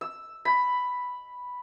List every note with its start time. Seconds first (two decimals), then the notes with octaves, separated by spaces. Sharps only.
0.01 E6
0.45 B5